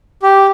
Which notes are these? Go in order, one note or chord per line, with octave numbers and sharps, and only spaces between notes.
G4